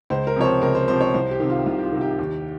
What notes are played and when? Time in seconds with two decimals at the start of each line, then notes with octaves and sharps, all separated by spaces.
0.10 C#2 C5
0.27 A#4
0.36 C3 F3 C#5
0.44 C5
0.62 C#2 A#4
0.75 C5
0.88 C3 F3 C5
1.01 C#5
1.14 C2 C5
1.31 G4
1.40 C3 D#3
1.50 F4
1.66 C2 F4
1.78 G4
1.84 F4
1.92 C3 D#3
2.01 G4
2.19 D#2